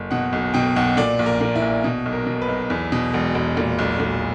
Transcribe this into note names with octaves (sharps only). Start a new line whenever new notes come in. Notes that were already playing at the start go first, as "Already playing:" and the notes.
Already playing: F#1
B2 F#5
B1
B2 G5
B1 F#5
A#2 D5
A#1
A#4
A#2
E4
A#1
B2
B1
A#4
B2
B4
B1
E2
B2
E1
E1
A#2
B1
A#2